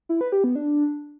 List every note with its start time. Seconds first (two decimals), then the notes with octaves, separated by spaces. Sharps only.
0.09 E4
0.21 B4
0.32 G4
0.44 B3
0.55 D4